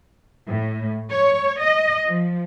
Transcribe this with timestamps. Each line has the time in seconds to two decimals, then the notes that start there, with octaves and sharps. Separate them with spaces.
0.47 A2
1.10 C#5
1.60 D#5
2.06 F3